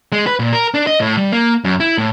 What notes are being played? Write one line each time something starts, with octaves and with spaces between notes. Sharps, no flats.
G#3
B4
A#2
A#4
D4
D#5
A2
G3
A#3
F#2
E4
A2